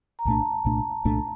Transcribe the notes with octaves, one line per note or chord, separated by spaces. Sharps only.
A#5
C2 A#2 A3 D4 A5
A#5
C2 A#2 A3 D4
C2 A#2 A3 D4